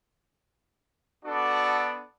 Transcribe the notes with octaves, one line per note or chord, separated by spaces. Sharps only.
B3 D4 F#4 A4 D5